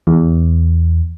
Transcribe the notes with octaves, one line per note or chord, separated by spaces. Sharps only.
E2